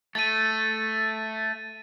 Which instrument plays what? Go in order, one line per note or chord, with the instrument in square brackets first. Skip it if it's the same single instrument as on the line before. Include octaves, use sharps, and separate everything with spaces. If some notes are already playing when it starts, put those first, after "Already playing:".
[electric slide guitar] A3 [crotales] A6 D#7